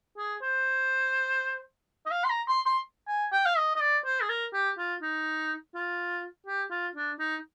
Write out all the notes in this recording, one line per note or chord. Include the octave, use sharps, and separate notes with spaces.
G#4
C5
D#5
F5
C6
A#5
C6
C6
G#5
G5
F5
D#5
D#5
D5
C5
G#4
A#4
G4
F4
D#4
F4
G4
F4
D4
D#4